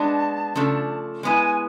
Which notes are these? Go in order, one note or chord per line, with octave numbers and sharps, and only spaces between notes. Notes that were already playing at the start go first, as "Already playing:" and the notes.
Already playing: G#3 B3 D4 A5
C#3 F3 A3 D4
G#3 B3 E4 G#5